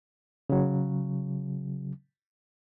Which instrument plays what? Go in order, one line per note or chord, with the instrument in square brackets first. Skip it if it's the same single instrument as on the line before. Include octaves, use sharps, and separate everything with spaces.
[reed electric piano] C#3 F#3